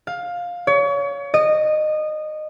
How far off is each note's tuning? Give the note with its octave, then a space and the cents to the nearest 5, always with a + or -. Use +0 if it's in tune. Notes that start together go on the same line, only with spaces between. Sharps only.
F5 +15
C#5 +30
D#5 -20